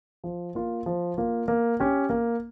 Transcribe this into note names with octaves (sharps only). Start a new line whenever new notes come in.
F3
A#3 F4
F3
A#3 F4
A#3
C#4 G4
A#3